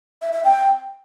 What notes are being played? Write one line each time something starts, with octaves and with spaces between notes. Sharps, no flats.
E5
E5
G5